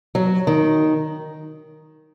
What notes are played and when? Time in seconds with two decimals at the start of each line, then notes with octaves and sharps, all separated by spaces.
0.15 F#3
0.47 D#3